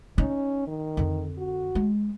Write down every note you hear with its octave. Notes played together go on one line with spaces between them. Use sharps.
C#4 D#4
D#3
F2 D3
F#4
G#3